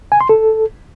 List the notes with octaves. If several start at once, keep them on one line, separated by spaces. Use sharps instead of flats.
G#5
C6
A4